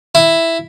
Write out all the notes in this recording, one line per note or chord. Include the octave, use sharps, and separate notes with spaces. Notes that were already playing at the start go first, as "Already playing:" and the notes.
E4